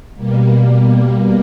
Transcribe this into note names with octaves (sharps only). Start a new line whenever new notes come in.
B2 G3 A#3